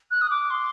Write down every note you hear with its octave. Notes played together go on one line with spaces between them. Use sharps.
F#6
D#6
D6
C6